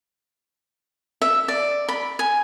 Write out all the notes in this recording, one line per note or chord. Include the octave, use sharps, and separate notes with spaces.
E5
D5
B5
G#5